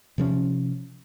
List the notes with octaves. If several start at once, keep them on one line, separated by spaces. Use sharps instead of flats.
C3 F3 C#4